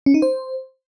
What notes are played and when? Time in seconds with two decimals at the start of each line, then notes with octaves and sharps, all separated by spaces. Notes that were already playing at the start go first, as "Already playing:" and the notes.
0.06 C#4
0.14 D#4
0.22 C5